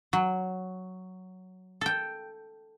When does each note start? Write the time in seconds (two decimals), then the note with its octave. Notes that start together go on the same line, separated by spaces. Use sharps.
0.13 F#3
1.81 A4 G5